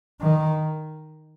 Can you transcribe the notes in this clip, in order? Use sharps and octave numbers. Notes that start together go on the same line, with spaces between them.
D#3